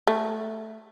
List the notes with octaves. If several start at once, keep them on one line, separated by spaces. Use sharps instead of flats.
A3